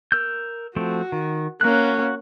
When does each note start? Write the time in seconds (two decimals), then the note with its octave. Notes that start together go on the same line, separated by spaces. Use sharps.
0.12 A#4 E6 G6
0.76 F3 A3 C4 F#4
1.12 D#3
1.61 A#3 C#4 F#4 F#6